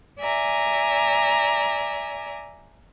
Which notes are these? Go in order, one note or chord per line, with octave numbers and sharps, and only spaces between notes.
D5 E5 G#5 A#5